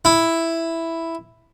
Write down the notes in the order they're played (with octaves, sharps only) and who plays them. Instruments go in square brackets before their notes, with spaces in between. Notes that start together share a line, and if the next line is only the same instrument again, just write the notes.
[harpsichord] E4